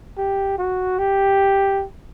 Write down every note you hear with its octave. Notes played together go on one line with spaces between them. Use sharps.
G4
F#4
G4